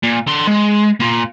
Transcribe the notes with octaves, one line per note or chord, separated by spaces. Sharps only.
A#2
D3 C6
G#3
A#3 F4